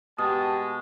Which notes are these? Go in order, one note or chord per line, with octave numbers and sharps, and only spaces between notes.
B2 G#3 G4 A5 D#6